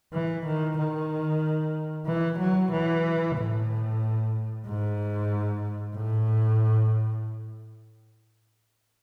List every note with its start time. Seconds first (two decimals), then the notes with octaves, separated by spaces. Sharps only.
0.13 E3
0.46 D#3
0.78 D#3
2.07 E3
2.39 F#3
2.72 E3
3.37 A2
4.66 G#2
5.95 A2